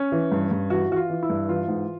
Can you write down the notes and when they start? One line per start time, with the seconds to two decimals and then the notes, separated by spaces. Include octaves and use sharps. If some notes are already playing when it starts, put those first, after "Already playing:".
Already playing: C#4
0.12 E3
0.32 G2
0.51 G2
0.70 E3 F#4
0.91 E3 F#4
0.96 F4
1.10 E3
1.23 E4
1.30 G2
1.48 E3 F4
1.68 G#2